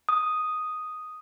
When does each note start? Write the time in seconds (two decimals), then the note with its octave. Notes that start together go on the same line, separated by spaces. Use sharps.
0.09 D#6